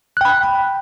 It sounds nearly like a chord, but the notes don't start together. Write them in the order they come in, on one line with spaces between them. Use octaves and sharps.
F#6 G5 B5